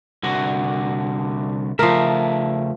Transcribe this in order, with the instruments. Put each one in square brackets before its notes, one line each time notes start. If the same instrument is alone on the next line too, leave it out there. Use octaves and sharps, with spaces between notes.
[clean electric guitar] C2 D3 F#4
[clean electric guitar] C#3 A3 E5 [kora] F3 A#4